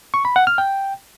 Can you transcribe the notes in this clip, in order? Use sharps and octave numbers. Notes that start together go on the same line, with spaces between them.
C#6
B5
F#5
F6
G5